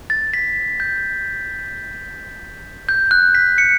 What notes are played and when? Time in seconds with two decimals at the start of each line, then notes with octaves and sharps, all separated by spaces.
0.10 A6
0.34 B6
0.80 G6
2.89 G6
3.11 F#6
3.35 B6
3.58 C#7